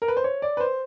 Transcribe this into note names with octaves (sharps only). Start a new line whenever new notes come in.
A#4
B4
C5
C#5
D5
B4
C5